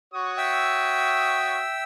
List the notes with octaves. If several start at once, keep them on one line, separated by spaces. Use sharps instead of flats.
F#4 C#5 D#6
E5 G5 E6